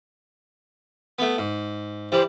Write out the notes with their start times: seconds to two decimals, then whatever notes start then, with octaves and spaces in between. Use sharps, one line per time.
1.19 A3 B3
1.38 G#2
2.12 E3 G3 C5